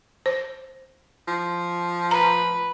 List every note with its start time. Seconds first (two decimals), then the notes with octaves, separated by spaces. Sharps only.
0.26 C5
1.28 F3
2.11 B4 A#5